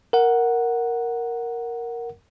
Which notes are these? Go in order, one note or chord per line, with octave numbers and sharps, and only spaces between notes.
A#4 F#5